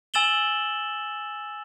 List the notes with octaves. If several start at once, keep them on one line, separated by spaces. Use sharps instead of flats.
G#5 E6 A6 E7 F#7 G7